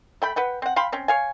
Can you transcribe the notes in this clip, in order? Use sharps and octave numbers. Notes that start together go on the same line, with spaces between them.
A3 G5 B5
B4 F#5 G5
C4 F#5
F5 G5 B5 C6
C4 C#4
C#5 F5 G#5